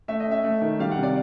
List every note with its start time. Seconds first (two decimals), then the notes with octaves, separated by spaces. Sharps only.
0.08 A3 E5
0.20 D#5
0.26 C#4
0.31 E5
0.44 A3
0.61 D#3
0.79 G3 F5
0.91 F#5
0.97 C3
1.03 D5